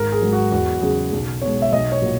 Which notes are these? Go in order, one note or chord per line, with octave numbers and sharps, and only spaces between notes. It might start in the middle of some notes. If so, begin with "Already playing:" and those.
Already playing: G#1 A#4
G#4
G#2 F#3
F#4
E2 F#4
C#3 F#3 G#4
B1
B2 G#3 C#5
E5
B1 D#5
C#5
A#2 F#3